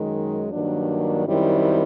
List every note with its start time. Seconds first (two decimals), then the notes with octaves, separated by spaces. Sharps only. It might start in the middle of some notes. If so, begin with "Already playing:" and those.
Already playing: F#2 D#3 G#3
0.53 G2 D#3 F#3 A#3 D4
1.27 F#2 D#3 G3 C4 E4